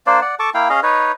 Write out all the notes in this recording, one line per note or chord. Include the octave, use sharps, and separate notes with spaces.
A#3 D4 C5 D5
D5 F#5
A4 A5 C#6 D6
A#3 E4 F5 G5
C#4 G#4 D#5 F5
D#4 B4 C#5